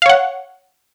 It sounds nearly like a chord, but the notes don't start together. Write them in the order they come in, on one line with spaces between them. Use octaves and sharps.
F5 C#5 F#5